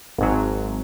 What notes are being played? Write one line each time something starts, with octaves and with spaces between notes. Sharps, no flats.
G#1 G#2 F#3